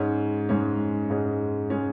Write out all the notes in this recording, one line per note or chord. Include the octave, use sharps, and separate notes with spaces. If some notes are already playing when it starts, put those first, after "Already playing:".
Already playing: G#2 G#3 C#4
G#2 G#3 C#4
G#2 G#3 C#4
G#3 C#4